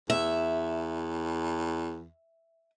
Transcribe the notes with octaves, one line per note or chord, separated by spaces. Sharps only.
E2 E5